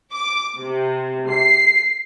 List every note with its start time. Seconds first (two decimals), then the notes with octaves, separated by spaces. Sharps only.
0.12 D6
0.59 C3
1.28 C7